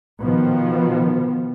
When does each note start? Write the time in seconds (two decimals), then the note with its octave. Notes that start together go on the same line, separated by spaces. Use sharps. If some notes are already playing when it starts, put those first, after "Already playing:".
0.21 B2 D#3 F3 B3